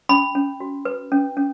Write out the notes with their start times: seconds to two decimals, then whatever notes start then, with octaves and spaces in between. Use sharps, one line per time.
0.09 C#4 B5
0.35 C#4
0.60 F#4
0.85 B4
1.12 C#4
1.37 C#4